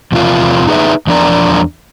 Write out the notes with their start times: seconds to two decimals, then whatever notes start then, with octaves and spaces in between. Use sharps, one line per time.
0.12 E2 C3 F3 F4 A#4
0.67 D#4 G#4 B4 E5
1.07 E2 F3 D4 A#4 D5 A#5